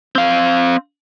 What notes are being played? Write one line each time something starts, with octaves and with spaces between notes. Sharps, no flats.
C4 F5